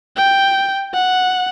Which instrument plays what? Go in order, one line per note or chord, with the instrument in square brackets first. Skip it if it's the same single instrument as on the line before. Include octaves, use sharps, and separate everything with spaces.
[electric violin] G5
F#5